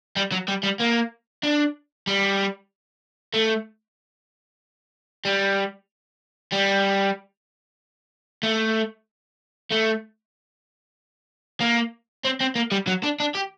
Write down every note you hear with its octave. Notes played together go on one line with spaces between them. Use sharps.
G3
F#3
G3
G3
A#3
D4
G3
A3
G3
G3
A3
A3
A#3
C4
C4
A#3
G3
F#3
D4
D4
G4